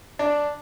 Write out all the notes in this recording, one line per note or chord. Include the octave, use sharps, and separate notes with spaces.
D4